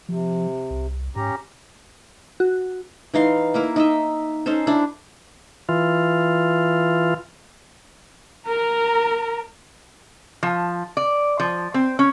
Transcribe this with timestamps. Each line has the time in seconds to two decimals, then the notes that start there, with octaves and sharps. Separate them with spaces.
0.09 C3 F3
0.70 C2
1.16 G#2 C#4 G4 A#5
2.40 F#4
3.14 E3 D#4 F5 C6
3.54 A#3 E4 A#4
3.76 D#4 D#5 E5
4.46 C#4 D#4 A4 C5
4.67 D4 E4
5.69 E3 F4
8.48 A#4 A#5
10.43 F3
10.97 D5
11.40 F3
11.74 C4
11.99 C#4